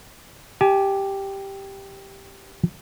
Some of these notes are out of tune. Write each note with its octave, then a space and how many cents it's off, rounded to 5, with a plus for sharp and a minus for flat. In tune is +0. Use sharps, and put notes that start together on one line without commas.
G4 +0 G#5 +35